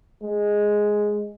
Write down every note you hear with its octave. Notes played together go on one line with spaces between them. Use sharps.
G#3